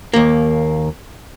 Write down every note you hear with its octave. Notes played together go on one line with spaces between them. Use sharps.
D#2 A#3